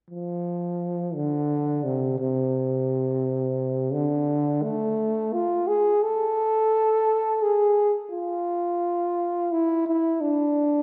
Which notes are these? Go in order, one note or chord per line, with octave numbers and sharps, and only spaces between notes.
F3
D3
C3
C3
D3
A3
F4
G#4
A4
G#4
F4
E4
E4
D4